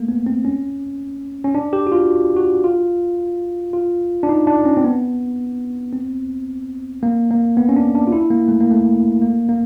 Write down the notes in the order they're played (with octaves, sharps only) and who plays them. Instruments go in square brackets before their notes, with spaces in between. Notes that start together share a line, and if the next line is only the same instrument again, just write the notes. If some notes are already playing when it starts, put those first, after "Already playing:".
Already playing: [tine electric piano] A3 A#3
B3
C4
C#4
C#4
D4
G4
F#4
F4
F#4
F4
F4
D4
D#4
D4
C#4
C4
B3
C4
A#3
A#3
B3
C#4
D4
D4
F4
E4
A#3
A3
A#3
A3
A#3
A#3